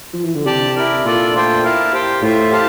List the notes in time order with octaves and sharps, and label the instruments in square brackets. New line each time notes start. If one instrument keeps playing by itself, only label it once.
[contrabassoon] F3
E3
D3
[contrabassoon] C3 [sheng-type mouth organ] G4 D5 A5
[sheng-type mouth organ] E4 A#4 D5
[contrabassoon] A#2 [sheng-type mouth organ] D4 F4 A4 D5
[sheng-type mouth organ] A3 D4 F4 C5 G5
E4 A#4 F5 A5
G4 C5 G5
[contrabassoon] A2 [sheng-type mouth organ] F4 C5 E5
[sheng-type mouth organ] G4 C5 F5 A5